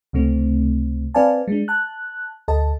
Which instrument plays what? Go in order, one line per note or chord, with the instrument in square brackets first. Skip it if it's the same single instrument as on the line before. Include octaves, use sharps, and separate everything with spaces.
[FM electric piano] C#2 C3 A3 C4
C4 B4 D5 F5 G#5 A5
G#3 D4
A5 F#6
D2 A4 D#5 A5